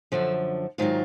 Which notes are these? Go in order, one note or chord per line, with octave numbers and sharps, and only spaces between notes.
F#2 D3 F3 A4
G#2 D#3 F#3 F4